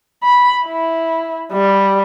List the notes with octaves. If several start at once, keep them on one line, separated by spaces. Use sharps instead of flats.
B5
E4
G3